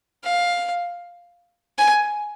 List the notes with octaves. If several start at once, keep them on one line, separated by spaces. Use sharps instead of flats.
F5
G#5